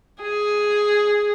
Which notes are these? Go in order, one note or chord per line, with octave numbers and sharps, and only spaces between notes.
G#4